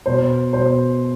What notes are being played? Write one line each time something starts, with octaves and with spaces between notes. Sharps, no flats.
B2 C5
B2 C5